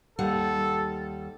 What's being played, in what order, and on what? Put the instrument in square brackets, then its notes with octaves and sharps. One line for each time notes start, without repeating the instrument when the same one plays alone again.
[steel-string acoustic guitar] D#2 G3 F#5 [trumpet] A4